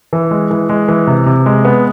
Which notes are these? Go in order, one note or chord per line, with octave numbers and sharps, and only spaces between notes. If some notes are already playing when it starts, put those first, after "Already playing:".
E3
G#3
E3
G#3
E3
C3
C3
G#3
B3